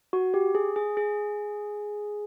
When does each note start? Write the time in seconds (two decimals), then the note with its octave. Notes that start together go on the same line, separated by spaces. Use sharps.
0.13 F#4
0.34 G4
0.55 G#4
0.76 G#4
0.97 G#4